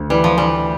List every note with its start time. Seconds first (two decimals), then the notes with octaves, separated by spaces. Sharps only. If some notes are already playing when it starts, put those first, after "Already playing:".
Already playing: D2
0.10 E3 G3
0.24 F3
0.37 E3 G3